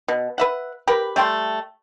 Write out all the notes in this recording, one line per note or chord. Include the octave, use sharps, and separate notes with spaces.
B2
B4 E5 F#5
G4 A#4 B4
G3 A3 G5 C6